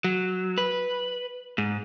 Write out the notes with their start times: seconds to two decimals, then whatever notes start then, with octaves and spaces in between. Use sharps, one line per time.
0.04 F#3
0.58 B4
1.58 G#2